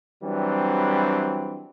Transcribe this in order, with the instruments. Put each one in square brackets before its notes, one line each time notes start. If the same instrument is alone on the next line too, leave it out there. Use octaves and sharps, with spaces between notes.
[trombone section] E3 F#3 G3 C4 D4